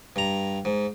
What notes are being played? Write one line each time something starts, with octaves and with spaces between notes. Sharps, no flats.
G2 A#5
G#2